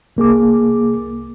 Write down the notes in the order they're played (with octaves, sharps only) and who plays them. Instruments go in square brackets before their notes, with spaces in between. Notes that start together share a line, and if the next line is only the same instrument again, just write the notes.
[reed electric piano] C2 A#3 G#4 D6